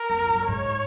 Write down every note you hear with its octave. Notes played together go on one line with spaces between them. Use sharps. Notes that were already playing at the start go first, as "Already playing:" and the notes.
Already playing: A#4
F2
F#2
G#2 C#5